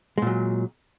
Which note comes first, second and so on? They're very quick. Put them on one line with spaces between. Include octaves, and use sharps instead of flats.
G#3 A#2 F#3